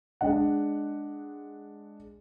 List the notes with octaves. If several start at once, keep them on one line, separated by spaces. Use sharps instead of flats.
G#3 D4 D#5 F#5